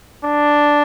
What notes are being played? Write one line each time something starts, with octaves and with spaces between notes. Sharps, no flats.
D4